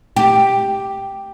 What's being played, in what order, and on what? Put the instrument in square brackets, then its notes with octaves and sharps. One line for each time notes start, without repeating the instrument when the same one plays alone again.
[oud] G4